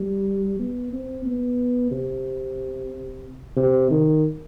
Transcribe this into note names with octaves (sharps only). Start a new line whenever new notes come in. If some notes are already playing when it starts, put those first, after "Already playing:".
Already playing: G3
B3
C4
B3
C3
C3
D#3